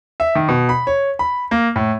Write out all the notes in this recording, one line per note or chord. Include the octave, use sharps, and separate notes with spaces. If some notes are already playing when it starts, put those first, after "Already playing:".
E5
D#3
B2
B5
C#5
B5
A#3
A2